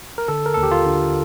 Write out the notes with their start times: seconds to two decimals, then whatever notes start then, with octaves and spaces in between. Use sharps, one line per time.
0.18 A#4
0.28 D3 A4
0.46 A#4
0.54 D#2 A4
0.63 G4
0.71 F4
0.86 D3